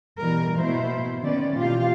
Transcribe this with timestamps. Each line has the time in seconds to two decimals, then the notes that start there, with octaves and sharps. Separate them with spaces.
0.19 B2 E3 G3 A#4
0.57 B2 A#3 E4 C5 E5
1.23 D#3 B3 C#4 D5
1.56 B2 E3 A#3 F4 G4 F5